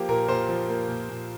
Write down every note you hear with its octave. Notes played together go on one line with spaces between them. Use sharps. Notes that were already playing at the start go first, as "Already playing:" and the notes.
Already playing: F3 A#3 G4
A#2 A#4
A#2 C5
F3
A#3
A#2
A#2